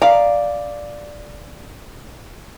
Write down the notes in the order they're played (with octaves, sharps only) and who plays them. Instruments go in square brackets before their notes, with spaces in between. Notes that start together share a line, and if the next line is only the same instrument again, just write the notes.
[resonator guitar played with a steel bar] D5 [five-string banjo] F5 A#5